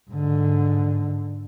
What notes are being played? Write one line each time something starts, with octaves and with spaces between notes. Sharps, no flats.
G#2 D3